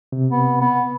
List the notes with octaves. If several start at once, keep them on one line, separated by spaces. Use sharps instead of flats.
C3
B3
B3